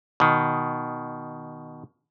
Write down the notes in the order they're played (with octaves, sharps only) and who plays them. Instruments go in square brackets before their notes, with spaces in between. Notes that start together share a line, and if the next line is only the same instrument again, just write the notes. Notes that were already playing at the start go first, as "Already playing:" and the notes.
[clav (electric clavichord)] B2 D#3